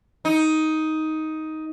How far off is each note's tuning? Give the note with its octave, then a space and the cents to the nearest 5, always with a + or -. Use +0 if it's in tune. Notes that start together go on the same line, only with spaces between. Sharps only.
D#4 +10